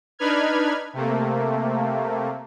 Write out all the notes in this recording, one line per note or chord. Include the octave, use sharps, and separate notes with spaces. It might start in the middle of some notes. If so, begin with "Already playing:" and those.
D4 D#4 B4 B5 F6 G#6
C3 A3 A#3